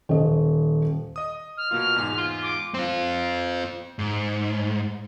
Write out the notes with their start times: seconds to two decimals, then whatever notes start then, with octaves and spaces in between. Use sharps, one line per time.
0.09 D#1 D#5
1.16 D#5 D#6
1.57 F6
1.71 B2 A#3 F4
1.96 E2 G#2 G#5
2.18 F4
2.42 D6
2.74 C4 F4
3.99 G#2